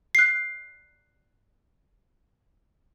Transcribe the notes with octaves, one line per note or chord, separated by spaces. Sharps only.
F#6 C7